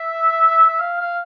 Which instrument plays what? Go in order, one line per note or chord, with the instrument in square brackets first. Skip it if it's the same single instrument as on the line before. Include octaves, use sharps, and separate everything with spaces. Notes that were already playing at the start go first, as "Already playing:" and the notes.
Already playing: [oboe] E5
E5
F5
F5